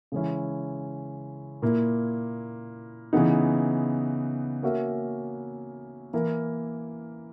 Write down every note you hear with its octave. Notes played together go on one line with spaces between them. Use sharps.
C#3 E3 G#3 C#4 E4
A#2 A#3 E4
C#3 E3 B3 D#4
A#3 C#4 F#4 A#4 E5
E3 A#3 E4 A#4